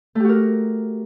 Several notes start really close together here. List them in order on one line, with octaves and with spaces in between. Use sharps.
A3 G4 F#4 A#4